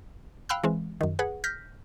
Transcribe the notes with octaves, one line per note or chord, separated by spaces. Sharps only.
F5 G5 B5 E6 F#6
E3 G#3 C4
F#2 D#3
G#4 B4 F#5
F6 G6 A#6 B6